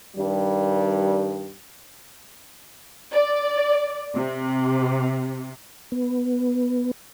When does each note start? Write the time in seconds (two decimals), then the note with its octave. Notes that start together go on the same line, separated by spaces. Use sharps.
0.16 G2 D#3 G3
3.11 D5
4.15 C3
5.92 B3